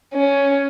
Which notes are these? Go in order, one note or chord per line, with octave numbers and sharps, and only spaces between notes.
C#4